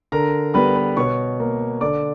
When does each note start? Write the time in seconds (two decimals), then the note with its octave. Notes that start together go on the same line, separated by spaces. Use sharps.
0.12 D3 A#4 A#5
0.54 G3 B3 B4 B5
0.76 B4 B5
0.96 B2 C#5 C#6
1.40 A#3
1.81 D3 D5 D6